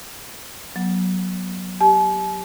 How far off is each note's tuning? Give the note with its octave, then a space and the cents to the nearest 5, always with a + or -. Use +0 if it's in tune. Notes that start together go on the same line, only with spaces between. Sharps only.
F#3 +0 B3 -35
G4 +0 A5 -45